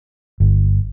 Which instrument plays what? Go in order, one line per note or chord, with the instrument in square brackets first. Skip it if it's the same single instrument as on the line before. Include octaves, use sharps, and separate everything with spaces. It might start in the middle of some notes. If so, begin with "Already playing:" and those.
[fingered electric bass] G1